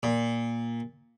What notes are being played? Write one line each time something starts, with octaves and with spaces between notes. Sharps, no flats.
A#2